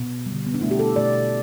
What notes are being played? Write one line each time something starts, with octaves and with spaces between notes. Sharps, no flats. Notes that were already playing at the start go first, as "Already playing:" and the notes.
Already playing: B2 B3
G3
D3
B3
D4
B2 A3 E4
G4
A4
B2 A3 D5